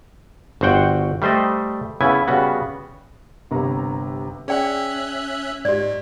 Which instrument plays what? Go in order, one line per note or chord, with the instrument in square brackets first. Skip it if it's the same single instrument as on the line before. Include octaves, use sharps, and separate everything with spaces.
[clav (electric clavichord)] G1 F#4 C5 F#5 G5
G3 A3 C5 D5 D#5
C#3 B3 E4 G#5
C#3 G3 B3 F#4
[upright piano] G1 C3 A#5
[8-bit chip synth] C#4 E5 F#6 [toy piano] G#4 D5 G5
[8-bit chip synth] G#2 [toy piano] G4 D5